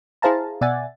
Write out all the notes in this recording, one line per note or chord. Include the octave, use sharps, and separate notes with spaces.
E4 G#4 C5 F5 A5 A#5
B2 D5 E5 F#5 G#5 A6